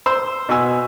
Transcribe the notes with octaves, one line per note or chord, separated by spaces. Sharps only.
C5 E6
B2 F#4 G#5 E6